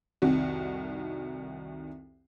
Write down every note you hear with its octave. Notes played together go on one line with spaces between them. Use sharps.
C2 F2 D#3 F#4